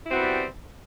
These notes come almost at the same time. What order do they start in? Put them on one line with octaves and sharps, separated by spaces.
E4 C4 F#4 B3 G3